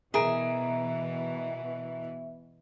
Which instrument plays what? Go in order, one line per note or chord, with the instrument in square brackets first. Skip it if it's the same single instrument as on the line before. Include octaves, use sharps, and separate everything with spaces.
[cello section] B2 E3 [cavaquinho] G#4 [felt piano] A#4 A#5 D7 [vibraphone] E5